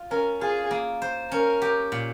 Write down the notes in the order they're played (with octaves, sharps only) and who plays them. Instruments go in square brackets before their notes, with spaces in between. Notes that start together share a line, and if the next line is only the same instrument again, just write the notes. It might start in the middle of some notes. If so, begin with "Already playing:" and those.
Already playing: [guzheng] F4
[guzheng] C#4 [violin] A#4
[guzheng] F4 [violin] G#4
[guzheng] A#3
C5
[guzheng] C#4 [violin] A#4
[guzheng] G4
A#2